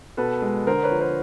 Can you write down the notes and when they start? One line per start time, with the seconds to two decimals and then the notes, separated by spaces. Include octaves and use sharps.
0.17 B2 A4 B4
0.42 G#3
0.67 D3 A#4 C5
0.83 B4 C#5
0.91 F3
1.00 A#4 C5